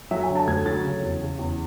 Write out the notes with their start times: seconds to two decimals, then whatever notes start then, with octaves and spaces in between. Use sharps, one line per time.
0.11 F#3 E5
0.23 G#5
0.30 D3
0.36 A5
0.47 D2 G#6
0.66 F#3 A6
0.84 C#3
1.02 E2
1.21 C#3
1.39 E2